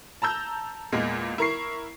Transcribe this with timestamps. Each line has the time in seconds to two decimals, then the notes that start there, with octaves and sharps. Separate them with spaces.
0.22 A5 A#5 E6 G6
0.92 E2 A#2 G#3 A#3
1.38 E4 A#4 C#6 C7